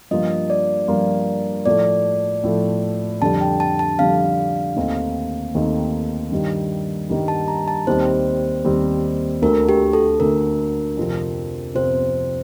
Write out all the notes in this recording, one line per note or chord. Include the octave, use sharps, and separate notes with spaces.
G2 F3 A#3 F4 D#5
D5
G2 F3 A#3 F4
A2 F3 A3 D5
A2 F3 A3
F2 D3 G3 D4 A5
G5
A5
A5
F2 D3 G3 D4 F5
D#2 D#3 A3 C4 D#4
D#2 D#3 A3 C4 D#4
G2 D#3 G3
G2 D#3 G3
A5
A#5
A5
D#2 D#3 G3 C4 C5
D#2 D#3 G3 C4
D2 D3 A3 A#4
G4
A4
D2 D3 A3 A#4
F2 C3 F3 C4
F2 C3 F3 C4 C5